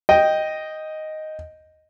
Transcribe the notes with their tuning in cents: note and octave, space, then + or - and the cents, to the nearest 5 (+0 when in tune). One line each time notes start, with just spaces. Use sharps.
D#5 +0 G5 +0